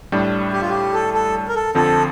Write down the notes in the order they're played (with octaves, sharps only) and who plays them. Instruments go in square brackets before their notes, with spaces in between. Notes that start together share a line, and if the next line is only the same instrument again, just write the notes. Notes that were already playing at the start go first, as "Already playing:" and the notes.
[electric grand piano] A2 G3 D4
[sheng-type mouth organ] G4
F4
G4
A4
A4
A#4
A4
[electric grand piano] F2 D3 F3 C4 [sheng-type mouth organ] A4